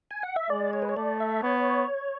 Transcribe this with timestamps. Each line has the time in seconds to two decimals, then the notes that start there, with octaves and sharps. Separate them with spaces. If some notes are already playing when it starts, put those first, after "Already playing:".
0.11 G#5
0.23 F#5
0.36 E5
0.50 G#3 D5
0.73 C#5
0.82 B4
0.89 C#5
0.97 A3 D5
1.20 E5
1.42 B3 C#5